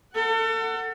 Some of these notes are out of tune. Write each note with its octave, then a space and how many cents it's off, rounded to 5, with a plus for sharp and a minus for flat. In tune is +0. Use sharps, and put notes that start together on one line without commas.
A4 +35 F#5 +10